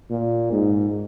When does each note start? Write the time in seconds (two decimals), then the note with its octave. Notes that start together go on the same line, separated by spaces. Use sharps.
0.11 A#2
0.52 G#2